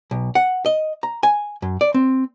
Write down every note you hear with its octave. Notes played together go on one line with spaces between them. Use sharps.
B1
F#5
D#5
A#5
G#5
F#2
D5
C4